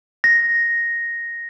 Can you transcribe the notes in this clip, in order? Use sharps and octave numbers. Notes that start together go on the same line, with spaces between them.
A#6